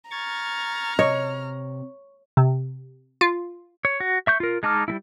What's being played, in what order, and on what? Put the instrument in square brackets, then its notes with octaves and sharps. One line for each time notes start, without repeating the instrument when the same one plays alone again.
[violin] A#5 F6 [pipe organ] C#6 G#6 A6
[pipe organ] C3 [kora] C#5 [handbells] D#5
[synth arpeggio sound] C3
F4
[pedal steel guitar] C#5
F#4
E5 C#6 G6
F4 A#4
G#3 D#4 A5 D6 F6
G3 A3 E4